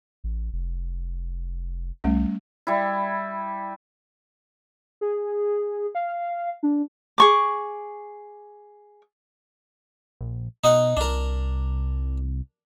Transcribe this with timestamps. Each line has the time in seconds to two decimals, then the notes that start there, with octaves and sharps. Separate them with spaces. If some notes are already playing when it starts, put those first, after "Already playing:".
0.24 A1
0.53 F1
2.04 C2 G3 A3 C#4
2.67 G3 E4
5.01 G#4
5.95 F5
6.63 D4
7.18 G#4 C#6 D6
10.21 A#1
10.64 B2 D#4 D#5 F#5
10.97 C2 D4 A#4